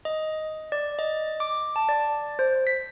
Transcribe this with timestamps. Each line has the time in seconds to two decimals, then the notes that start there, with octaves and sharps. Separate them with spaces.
0.05 D#5
0.72 D5
0.99 D#5
1.40 D6
1.76 A5
1.89 D5
2.39 C5
2.67 B6